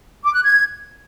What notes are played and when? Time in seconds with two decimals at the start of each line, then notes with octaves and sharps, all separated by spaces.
0.23 D6
0.33 F#6
0.44 G#6